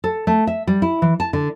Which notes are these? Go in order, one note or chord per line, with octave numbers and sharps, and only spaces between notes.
A4
A3
E5
G3
E4
E3
A5
D3